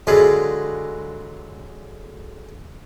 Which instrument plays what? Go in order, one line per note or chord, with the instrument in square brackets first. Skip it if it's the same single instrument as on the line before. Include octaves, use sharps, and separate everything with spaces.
[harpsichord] D3 F#3 G#3 F4 G#4 B4